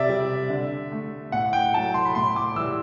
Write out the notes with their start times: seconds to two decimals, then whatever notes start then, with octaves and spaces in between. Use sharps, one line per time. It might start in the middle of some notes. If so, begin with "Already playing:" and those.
Already playing: C3 D5 E5
0.09 G3
0.50 D3
0.92 A3
1.32 A2 F#5
1.53 G5
1.74 F#3 A3 A5
1.94 C6
2.05 B5
2.15 A2 C6
2.36 D6
2.56 E3 G3 E6